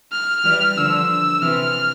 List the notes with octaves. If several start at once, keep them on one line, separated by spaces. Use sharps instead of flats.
F6
E3 G3
D3 F3 E6
C3 E3 F6